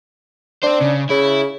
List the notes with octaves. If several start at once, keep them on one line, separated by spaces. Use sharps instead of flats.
C4 D4 C5
C#3
C#3 E4